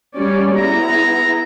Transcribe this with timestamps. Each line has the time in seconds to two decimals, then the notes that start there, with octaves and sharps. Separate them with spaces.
0.17 G3 C#4 D5
0.56 B3 E4 G#4 A#5